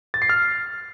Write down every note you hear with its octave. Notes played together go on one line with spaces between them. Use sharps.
A6
C7
F6